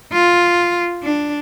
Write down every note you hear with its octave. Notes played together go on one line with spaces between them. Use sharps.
F4
D4